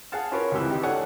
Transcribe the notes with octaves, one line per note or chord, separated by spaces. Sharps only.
G#4 F5 F#5 A5 F6
C#4 F4 F#4 A#4 B4 C#5
C#2 C3 E3
D#3 E3 D#4 G4
D4 A4 C#5 F#5 G#5 F#6